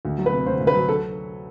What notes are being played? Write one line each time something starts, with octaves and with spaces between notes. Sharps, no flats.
D2
F#3
B4
C3
D2 C5
D2
B4
F#3
A4